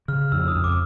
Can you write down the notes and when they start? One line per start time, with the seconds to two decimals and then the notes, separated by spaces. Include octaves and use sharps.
0.08 C#3 F6
0.32 F2 E6
0.48 D#6
0.55 F2
0.64 D6